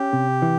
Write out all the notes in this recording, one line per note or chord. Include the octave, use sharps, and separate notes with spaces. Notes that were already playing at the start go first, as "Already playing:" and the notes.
Already playing: C#4 G4
C3
E3